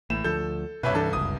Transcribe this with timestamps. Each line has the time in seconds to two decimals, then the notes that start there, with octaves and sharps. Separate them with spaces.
0.10 A1 A2 E7
0.24 D2 F3 A4 G6
0.83 C2 G2 B2 B4 C#5 E5
0.95 E3 D4 A4
1.13 F#1 C#2 D#6